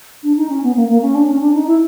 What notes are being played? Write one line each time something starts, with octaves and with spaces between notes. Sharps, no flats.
D4
D#4
C#4
B3
A#3
A#3
C#4
D4
C#4
D4
D#4
E4